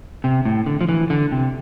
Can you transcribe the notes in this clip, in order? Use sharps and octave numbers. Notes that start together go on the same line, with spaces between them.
C3
A2
D3
F3
E3
D3
C3